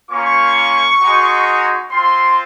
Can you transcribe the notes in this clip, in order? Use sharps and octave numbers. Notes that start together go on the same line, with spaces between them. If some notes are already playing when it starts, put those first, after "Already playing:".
A#3 C#4 F4 C#6
G#3 D#4 F#4
C4 F4 C6